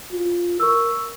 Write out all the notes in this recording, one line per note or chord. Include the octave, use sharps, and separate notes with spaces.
F4
A#4 C#6 E6